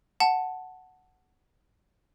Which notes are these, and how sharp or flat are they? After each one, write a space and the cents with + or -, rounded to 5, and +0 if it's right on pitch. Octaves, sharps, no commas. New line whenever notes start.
F#5 +0 A5 +0